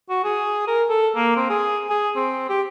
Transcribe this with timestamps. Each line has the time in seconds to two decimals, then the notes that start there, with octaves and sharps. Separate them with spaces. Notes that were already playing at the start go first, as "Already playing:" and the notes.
0.10 F#4
0.24 G#4
0.67 A#4
0.89 A4
1.15 A#3
1.36 C4
1.50 G#4
1.90 G#4
2.16 C4
2.49 G4